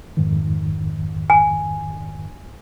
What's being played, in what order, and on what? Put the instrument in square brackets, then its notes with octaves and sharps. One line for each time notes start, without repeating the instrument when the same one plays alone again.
[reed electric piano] F2 G#2 D#3
[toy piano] G#5